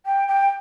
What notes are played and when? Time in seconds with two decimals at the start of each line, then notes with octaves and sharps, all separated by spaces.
0.05 G5
0.28 G5